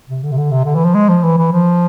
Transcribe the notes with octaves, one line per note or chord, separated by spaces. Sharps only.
C3
D3
C3
D3
C3
D3
E3
F3
G#3
F3
E3
E3
F3